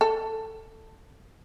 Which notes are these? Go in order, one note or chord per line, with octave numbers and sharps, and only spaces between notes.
A4